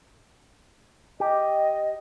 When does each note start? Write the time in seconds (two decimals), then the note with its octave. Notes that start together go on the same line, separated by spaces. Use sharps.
1.20 G4 D#5